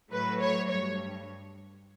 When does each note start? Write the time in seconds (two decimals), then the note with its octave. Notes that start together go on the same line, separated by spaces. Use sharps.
0.11 A2 F#3 A3 B4
0.41 C#5
0.69 G2 C#5